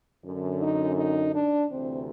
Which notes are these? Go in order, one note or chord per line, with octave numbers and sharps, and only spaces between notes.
F#2 D3
D#4
D#4
D4
D2 C3 E3 C4